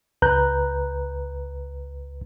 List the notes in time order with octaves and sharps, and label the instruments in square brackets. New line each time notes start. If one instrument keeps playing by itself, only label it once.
[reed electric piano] C#2 B4 A#5 F#6 G6